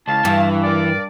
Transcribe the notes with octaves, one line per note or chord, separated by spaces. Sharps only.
C#2 E4 F5 A5
G2 E3
A#4 D5